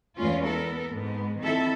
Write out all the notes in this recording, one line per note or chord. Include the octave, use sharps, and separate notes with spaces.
E2 E3 G#3 A3 C#4 F4
B3 A4 A#4
G#2 B3
D#3 F3 C4 E4 A4 E5